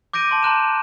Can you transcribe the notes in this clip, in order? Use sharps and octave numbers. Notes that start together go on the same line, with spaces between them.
D6 G6 A#6 D7 D#7
A5 C6 D6
A5 A#5 C6 F#6 G6 E7